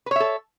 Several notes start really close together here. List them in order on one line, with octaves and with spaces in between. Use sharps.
B4 C#5 E5 A4